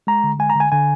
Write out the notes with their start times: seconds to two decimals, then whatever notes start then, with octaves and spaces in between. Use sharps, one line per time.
0.07 G#3 A#5
0.24 D3
0.39 G#3 G#5
0.50 A#5
0.55 D3 G#5
0.72 D3 G#5